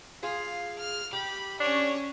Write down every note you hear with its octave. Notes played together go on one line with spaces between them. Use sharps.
F4 G#4 F5
F6
G4 B5
C#4 D4 C#5